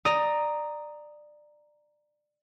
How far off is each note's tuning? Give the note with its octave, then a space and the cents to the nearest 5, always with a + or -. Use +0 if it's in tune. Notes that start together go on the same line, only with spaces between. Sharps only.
D5 +20 A#5 +0 D#6 +0